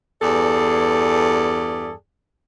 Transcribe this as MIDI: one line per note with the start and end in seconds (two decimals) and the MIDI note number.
0.22 1.92 40
0.22 1.92 43
0.22 1.92 68
0.22 1.92 69
0.22 1.92 74